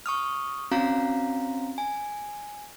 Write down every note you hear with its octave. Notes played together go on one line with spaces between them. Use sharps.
C#6 D#6 F6
C4 C#4 F#4 F5 A#5
G#5